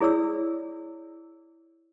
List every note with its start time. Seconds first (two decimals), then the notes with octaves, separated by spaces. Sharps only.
0.01 E4 G#4 C#5 D5 E6